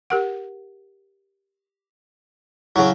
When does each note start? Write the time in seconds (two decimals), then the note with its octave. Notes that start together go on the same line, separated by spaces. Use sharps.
0.10 G4 A#4 F#5
2.76 C#3 F#3 E4